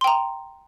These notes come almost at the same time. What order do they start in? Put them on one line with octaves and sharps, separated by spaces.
C6 G5 A#5